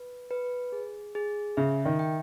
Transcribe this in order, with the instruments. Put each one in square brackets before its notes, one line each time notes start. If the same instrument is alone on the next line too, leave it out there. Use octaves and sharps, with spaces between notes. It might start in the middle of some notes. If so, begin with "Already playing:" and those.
Already playing: [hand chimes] B4
B4
G#4
G#4
[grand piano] C#3 [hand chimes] E5
[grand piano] D#3
[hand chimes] G5